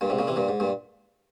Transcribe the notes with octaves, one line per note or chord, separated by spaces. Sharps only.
G2 A#2
G#2 C3
A#2 C#3
C3 E3
G2 A#2
G#2
G2 A#2